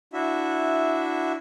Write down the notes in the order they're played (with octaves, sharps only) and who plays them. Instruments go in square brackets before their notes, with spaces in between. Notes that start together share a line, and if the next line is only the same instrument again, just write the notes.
[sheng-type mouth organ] D4 E4 F#4 E5